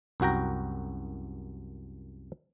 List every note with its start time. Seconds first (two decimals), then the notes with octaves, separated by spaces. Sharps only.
0.20 C2 F#2 F#4 G5 A#5